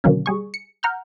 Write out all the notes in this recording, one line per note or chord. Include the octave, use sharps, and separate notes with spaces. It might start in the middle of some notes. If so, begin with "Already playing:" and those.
B2 D3 D#3 F#3 A#3 C#4
G3 G#4 C#6
C#7
F#5 A#5 F6 G6